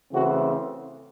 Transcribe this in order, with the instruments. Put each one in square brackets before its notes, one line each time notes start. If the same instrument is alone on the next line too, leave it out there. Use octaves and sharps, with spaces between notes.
[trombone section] C#3 E3 A3 C4 F#4